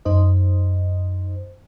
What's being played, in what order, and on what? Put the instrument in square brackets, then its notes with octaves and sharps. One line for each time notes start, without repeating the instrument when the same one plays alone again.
[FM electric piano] F#2 D#4 C5 D#5